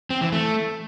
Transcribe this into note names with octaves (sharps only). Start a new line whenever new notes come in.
C4
E3
A3